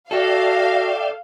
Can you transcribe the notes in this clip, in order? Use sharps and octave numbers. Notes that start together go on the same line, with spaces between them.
F#4 A4 D5 E5 F5 G5